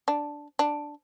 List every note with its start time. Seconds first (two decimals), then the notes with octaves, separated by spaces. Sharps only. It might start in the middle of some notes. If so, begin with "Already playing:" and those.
0.08 D4
0.59 D4